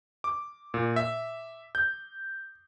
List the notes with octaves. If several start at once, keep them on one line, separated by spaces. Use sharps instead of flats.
D6
A#2
E5
G6